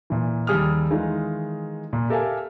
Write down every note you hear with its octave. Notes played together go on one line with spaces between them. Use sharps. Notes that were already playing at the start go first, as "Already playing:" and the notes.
A#2 E3
D#2 F3 G3 G#4 D#6 F6
D#3 E3 G#3 D#4 F4
A#2
G4 A4 A#4 E5 F5 G#5